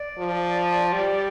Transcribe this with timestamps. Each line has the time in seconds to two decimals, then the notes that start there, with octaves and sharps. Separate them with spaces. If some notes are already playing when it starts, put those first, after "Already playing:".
Already playing: D5
0.18 F3
0.93 G3